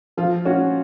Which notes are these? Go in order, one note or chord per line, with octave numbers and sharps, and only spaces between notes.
F3 F4
C#4 F#4